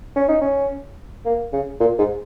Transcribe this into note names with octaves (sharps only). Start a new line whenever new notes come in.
C#4
D#4
C#4
A#3
C#3
A#2
G#2